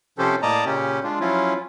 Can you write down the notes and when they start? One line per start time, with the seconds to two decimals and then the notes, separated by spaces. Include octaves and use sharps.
0.18 C3 F3 C#4 G4 A4 C5
0.42 A2 A#3 D5 D#5 A5 A#5
0.66 A#2 C#3 C#4 G4
1.04 G#3 D4 F4
1.20 F3 F#3 C#4 E4 F4